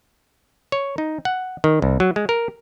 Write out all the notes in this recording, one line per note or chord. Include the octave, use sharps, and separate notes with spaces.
C#5
D#4
F#5
D#3
C2
F#3
G#3
A#4